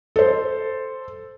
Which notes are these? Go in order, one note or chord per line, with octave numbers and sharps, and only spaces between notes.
A4 C5